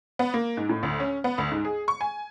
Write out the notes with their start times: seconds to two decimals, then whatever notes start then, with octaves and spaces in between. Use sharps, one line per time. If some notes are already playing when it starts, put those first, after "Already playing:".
0.19 B3
0.34 A#3
0.57 G#2
0.69 A2
0.83 D2
1.00 C#4
1.24 B3
1.38 D2
1.51 G#2
1.65 G#4
1.88 C#6
2.01 G#5